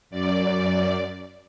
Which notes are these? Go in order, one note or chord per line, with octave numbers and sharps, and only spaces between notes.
F#2 D5